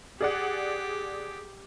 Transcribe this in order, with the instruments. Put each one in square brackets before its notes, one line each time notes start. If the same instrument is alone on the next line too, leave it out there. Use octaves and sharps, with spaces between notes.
[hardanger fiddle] G4 [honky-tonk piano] G#4 D5 F#5